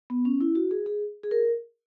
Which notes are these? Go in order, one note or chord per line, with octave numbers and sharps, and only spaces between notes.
B3
C#4
E4
F#4
G#4
G#4
G#4
A#4